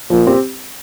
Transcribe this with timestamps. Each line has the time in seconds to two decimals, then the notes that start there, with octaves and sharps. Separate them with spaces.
0.10 A#2 F3
0.27 C4 G4